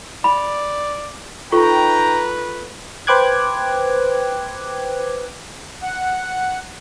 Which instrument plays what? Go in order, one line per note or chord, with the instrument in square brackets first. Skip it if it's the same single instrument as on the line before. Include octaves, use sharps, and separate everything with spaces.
[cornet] D5 [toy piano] B5
[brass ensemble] D#4 G5 A#5 [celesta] F4 A4 C#6 [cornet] B4
[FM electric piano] B4 C5 G5 D6 F#6 G#6
[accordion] F#5